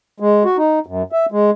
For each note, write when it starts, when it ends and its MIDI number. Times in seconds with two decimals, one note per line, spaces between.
0.20 0.43 56
0.45 0.57 66
0.57 0.79 63
0.86 1.03 42
1.12 1.26 76
1.32 1.51 56